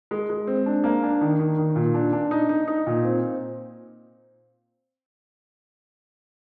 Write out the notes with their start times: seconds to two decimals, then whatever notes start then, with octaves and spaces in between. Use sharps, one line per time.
0.11 G#3
0.30 G#3
0.47 C4
0.66 D4
0.84 A#3
1.03 D4
1.21 D#3
1.39 D#3
1.58 D#3
1.76 A#2
1.94 D4
2.13 D4
2.31 D#4
2.49 D#4
2.68 D#4
2.87 A#2
3.04 C4